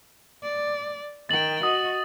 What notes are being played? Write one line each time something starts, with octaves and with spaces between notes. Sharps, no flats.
D5
D#3 G5 A6 F#7
F#4 D#5 D#6